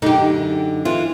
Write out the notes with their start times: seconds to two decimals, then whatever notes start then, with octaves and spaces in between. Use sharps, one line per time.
0.02 F#2 D3 D#4 G4
0.85 E3 F4